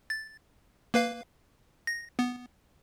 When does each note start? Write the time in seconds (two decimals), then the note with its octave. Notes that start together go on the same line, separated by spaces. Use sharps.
0.10 A6
0.94 A#3 B4 F5
1.87 A#6
2.19 B3